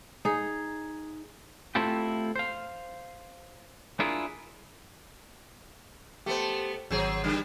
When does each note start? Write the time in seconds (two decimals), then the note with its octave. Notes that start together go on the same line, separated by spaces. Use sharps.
0.25 D#4 G#4
1.75 A3 C4 E4 F4 G4
2.36 C5 F5
4.00 D4 E4 F4 G#4 A#4
6.26 A3 B3 G4 C5
6.91 G#1 F#3 C4 G#4 C#5
7.24 D3 G3